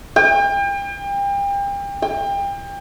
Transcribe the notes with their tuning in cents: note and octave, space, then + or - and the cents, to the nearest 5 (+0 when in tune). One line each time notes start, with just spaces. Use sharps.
G5 +35
G5 +30